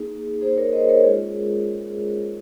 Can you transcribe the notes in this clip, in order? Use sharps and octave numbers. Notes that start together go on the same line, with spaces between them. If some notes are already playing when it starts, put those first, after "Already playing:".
Already playing: A#3 D#4 G#4
A#3 D#4 G#4 C5
A#4 C#5
C5 D#5
A#4 C#5
G#3 C#4 F4 G#4